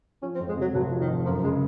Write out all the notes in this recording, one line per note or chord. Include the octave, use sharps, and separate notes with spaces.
F3 C#4
C4
F2
G#3
C3 F#3
F1 F#3
F3
D#3
F2
F#2 F3
C#3 G#3